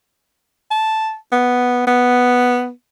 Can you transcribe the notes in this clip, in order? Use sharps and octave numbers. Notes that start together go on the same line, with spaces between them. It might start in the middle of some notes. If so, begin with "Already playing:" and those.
A5
B3
B3